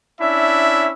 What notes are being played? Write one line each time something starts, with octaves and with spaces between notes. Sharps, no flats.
C#4 D4 E4 E5